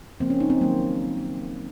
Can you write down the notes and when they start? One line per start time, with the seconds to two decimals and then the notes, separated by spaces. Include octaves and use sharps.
0.20 C#3 F3 A#3 C4
0.30 C#4
0.40 D#4
0.50 C4
0.61 D#3 F#3 A#3